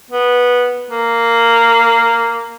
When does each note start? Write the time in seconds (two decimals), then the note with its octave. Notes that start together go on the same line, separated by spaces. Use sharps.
0.11 B3
0.90 A#3